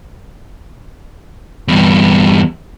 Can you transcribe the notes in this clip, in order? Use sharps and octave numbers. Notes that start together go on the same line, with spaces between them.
E2 G2